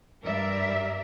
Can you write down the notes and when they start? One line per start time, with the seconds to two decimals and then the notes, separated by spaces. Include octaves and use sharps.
0.23 G2 G3 A#4 D5 E5